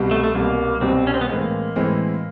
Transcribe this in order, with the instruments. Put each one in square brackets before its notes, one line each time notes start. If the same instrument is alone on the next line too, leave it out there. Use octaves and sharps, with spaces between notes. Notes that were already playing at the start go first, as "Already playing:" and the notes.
Already playing: [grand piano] C2 B2 G3
[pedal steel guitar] A3
A3
[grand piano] C2 B2 G3 [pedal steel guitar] A#3
[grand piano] C2 B2 G3 [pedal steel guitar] C4
[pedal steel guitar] C#4
C4
B3
[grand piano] A2 E3 G#3 C4 [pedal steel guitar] A#3
[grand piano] A2 E3 G#3 C4